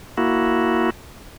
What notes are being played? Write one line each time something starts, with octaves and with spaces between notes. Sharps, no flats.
A#3 E4 F#4